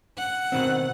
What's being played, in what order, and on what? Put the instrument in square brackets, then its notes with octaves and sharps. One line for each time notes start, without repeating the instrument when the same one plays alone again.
[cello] F#5
[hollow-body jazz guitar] B2 D#3 C4